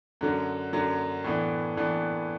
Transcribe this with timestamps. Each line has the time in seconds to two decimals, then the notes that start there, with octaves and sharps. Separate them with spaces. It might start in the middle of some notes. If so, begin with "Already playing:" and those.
0.21 F#2 D3 F#3
0.73 F#2 D3 F#3
1.24 A2 E3 B3 D4
1.77 A2 E3 B3 D4